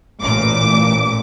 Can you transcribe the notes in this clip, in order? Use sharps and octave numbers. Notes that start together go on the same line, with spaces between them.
A1 A#2 D6